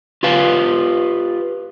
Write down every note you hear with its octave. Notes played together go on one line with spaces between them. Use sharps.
F4 G4 B4 F5